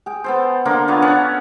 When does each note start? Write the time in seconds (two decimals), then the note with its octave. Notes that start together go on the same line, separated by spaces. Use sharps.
0.06 G#4 G5
0.24 B3 A4 C5
0.65 D3 A#3 A#4 C6
0.88 B3 D4 F4 C#5
1.02 C#4 A4 C#5 F#5